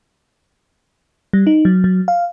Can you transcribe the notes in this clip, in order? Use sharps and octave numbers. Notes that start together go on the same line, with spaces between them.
G3
D#4
F#3
F#3
F5